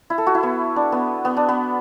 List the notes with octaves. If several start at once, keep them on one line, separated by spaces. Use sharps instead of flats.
E4
A4
F#4
E4
B3
D4
B3
B3
D4
B3